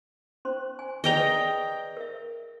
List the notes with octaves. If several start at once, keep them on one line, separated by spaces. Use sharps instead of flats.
C#4 C5 C6
G#5
G#4 B4 D5 D#5 G5 A#5
A#4 E5